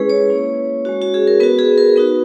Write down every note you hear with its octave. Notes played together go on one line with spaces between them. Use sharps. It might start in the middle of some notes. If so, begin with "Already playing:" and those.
Already playing: G#3 C#4 E4 G#4 B4
C#5
A#3 C#4 E4
G#3 C#4 F#4
F#4
G#4
A#4
B3 F#4 B4
G#4
A#4
B3 D#4 F#4 B4